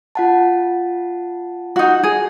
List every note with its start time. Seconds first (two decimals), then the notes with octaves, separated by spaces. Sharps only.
0.15 F4 F#5 A5
1.76 D#4 F#4
2.04 G#4